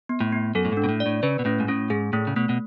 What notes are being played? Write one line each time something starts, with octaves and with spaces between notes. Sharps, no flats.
B3
A2
B3
F#2 A4
A2
G#2 D4
B2
A2
D5
A2
C#3 B4
B2
A2 C#4
G#2
A2 C#4
G#2 G#4
A2 A3
C#3
B2 A3
B2